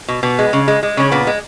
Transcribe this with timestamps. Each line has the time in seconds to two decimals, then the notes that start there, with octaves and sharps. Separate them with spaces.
0.08 B2
0.23 B2 B3
0.39 G#3
0.53 C#3
0.68 G#3
0.83 G#3
0.97 C#3 C#4
1.12 A#2 B3
1.27 G#3